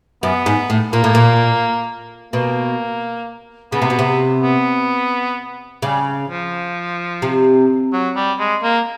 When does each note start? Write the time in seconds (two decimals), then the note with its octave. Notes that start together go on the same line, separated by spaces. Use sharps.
0.23 F#2 B3
0.46 G#2
0.70 A2
0.93 A#2 A#3
1.04 A2
1.15 A#2
2.33 B2 A#3
3.72 C#3 B3
3.82 C3
3.90 B2
3.99 C3
4.43 B3
5.82 C#3 G3
6.29 F3
7.22 C3
7.93 F#3
8.16 G3
8.39 G#3
8.63 A#3